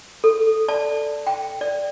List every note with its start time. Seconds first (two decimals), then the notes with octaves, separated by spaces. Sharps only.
0.24 A4
0.68 D5 A5
1.27 G5
1.61 D5